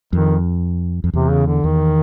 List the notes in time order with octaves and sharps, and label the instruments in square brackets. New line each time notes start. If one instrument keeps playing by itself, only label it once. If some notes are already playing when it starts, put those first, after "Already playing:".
[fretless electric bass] F2 [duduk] D#3
[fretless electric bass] F2
[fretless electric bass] E2 [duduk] C3
[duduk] C#3
D3
[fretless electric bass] E2 [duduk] D#3